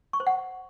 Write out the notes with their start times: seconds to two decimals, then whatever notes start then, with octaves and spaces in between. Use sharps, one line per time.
0.13 C#6
0.20 C5
0.27 F#5